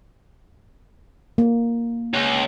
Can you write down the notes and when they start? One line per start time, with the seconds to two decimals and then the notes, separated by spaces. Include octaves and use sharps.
1.38 A#3
2.13 C#2